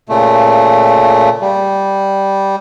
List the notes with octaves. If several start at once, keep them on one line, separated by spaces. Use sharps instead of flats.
A#2 C#3 A3
G3